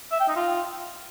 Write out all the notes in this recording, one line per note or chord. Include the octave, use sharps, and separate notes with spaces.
E5
G5
D#4
F4